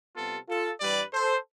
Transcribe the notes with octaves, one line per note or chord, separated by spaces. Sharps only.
C3 G3 B3 F4 A4
F4 A4
G2 E3 G3 B4 D5
A4 C5